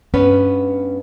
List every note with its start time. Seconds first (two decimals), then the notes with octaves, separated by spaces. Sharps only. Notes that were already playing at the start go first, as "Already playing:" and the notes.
0.14 G2 B3 C#4 B4